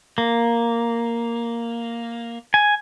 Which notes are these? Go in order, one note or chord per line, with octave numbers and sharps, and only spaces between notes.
A#3
G#5